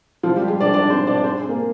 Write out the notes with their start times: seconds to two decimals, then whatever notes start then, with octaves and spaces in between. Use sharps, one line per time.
0.23 F3 F4
0.36 G3 G4
0.48 G#3 G#4
0.61 D4 D5
0.73 D4 D5
0.90 C4 C5
1.07 D4 D5
1.17 D5
1.24 C4 C5
1.42 G#4
1.49 A#3 A#4